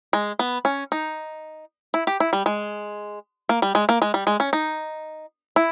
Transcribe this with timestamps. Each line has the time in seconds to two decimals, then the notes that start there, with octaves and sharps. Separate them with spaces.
0.13 G#3
0.39 B3
0.65 C#4
0.92 D#4
1.94 E4
2.07 G4
2.20 E4
2.33 G3
2.46 G#3
3.49 A#3
3.62 G3
3.75 G#3
3.89 A#3
4.02 G#3
4.14 G3
4.27 G#3
4.40 C#4
4.53 D#4
5.56 E4